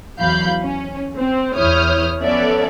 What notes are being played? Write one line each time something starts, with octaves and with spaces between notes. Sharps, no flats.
E2 E3 F#3 F5 B5 G6
C#4
C4
E2 E4 C#5 D#6 F6 G6
F3 B3 C#4 A4 D5 E5